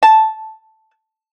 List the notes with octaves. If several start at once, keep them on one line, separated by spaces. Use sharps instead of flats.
A5